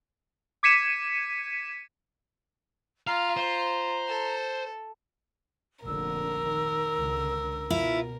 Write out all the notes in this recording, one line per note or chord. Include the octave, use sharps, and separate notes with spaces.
D6 G#6 B6 C#7 D#7 E7
F4 F5 A#5
C5
A4
F1 A#1 D3 A#4 E6
D#3
C#2 D3
B2 E4 F4